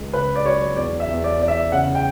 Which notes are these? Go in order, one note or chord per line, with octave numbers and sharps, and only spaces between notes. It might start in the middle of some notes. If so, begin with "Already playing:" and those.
Already playing: C#2
C#3 B4
D5
F#3 C#5
E2 D5
E5
E2
D5
E2 D5
E5
C#3 F#5
G5